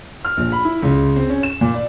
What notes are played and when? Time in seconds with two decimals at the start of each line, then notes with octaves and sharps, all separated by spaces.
0.25 F6
0.37 A#1
0.52 B5
0.65 E4
0.82 C#2
1.16 C4
1.29 C#4
1.43 E7
1.61 A#2
1.74 D5